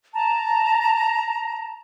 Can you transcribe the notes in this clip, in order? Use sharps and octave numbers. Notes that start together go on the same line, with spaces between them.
A5 A#5